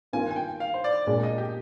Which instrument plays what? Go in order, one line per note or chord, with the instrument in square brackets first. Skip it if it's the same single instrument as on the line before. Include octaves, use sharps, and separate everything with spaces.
[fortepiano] G2 D#3 A#3 F4 A#4 [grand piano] G#5
[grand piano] G#5
G5
F5
C5
D5
[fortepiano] A#2 G#3 D4 [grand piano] D5
[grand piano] D#5
G4